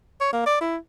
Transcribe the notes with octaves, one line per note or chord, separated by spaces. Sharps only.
C#5
A#3
D5
E4